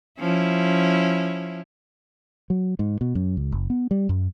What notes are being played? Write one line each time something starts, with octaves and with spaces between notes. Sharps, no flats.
F3 C#4 E4
F#3
G#2
B2
F#2
C#2
F#1
B3
G3
F#2